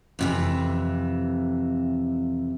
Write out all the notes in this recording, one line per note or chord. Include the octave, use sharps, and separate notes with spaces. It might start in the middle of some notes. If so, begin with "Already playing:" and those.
F2 C3 E3